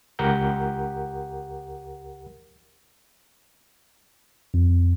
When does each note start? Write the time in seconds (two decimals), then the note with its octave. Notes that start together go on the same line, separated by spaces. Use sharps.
0.19 C#2 G4 A#4 F#5 G6
4.54 F2